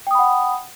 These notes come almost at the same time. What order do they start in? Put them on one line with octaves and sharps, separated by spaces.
G5 D#6 B5 F#5